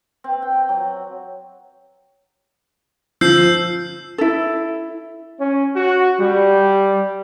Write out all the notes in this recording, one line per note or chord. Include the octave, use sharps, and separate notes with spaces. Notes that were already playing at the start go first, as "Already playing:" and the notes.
C4
G5
F#3
F3 E6 G6 C7
E4 A4
C#4
F#4
G3